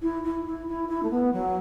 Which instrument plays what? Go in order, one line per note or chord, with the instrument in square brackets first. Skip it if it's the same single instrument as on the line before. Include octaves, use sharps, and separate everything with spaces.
[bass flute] E4
E4
E4
E4
E4
A3
B3
F#3